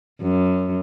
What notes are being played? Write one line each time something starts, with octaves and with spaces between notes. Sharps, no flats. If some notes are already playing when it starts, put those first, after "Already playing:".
F#2